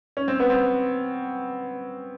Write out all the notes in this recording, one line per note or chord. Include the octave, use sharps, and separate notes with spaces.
C#4
C4
B3
C4